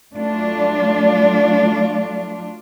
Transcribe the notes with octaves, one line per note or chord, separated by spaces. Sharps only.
F#3 A3 D4 F4